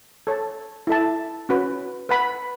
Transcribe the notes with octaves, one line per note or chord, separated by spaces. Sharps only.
A4 C#5 A5
E4 A4 E5 A5
C#4 F#4 B4
B4 F#5 B5